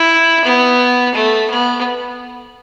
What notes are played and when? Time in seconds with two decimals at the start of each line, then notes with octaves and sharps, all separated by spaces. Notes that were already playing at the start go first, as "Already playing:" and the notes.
Already playing: E4
0.45 B3
1.15 A3
1.50 B3